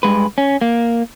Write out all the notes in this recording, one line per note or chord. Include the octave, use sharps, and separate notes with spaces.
G2 G#3 B4
C#4
A#3